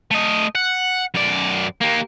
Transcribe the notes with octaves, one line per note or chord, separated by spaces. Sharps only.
A3 D#5
F#5
F#2 D5
A#3 G4